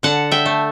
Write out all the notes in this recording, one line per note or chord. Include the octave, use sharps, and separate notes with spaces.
D3 F#5 A5
E5 G5
A3